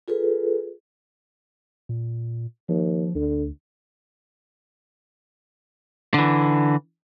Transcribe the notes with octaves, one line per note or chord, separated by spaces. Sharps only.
F4 G#4 A4 B4
A#2
D#2 F3
D2 D3
D3 E3